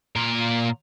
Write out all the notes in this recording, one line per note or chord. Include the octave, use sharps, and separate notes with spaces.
A#2 A#4